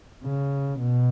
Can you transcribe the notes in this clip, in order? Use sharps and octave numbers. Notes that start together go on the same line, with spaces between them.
C#3
B2